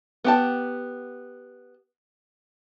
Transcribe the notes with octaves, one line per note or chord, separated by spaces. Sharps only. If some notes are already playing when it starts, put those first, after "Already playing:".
B3 G4 A5